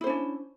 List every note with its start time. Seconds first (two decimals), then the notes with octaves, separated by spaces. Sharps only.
0.01 E4
0.04 C5
0.07 C#4
0.10 D4